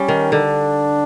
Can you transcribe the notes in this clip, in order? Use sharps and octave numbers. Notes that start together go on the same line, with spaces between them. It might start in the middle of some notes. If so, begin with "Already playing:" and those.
Already playing: G3 C#4
D#3
D3 D4